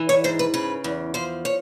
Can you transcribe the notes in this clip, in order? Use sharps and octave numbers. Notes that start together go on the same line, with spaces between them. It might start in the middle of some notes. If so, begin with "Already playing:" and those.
Already playing: E3
C#5
G#2 C5
B4
C#3 B4
E2
F3 C5
C#5